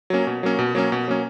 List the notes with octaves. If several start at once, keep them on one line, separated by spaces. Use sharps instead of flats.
F#3 A#3 C#4
B2
F#3 A#3 C#4
B2
F#3 A#3 C#4
B2
F#3 A#3 C#4